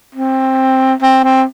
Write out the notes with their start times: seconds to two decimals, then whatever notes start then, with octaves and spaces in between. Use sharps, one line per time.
0.15 C4
1.02 C4
1.24 C4